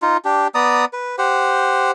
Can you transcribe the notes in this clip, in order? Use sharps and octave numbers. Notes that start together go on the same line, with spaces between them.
D#4 F4
D4 G4
B3 D5 A#5 D#6
B4
G4 C5 F#5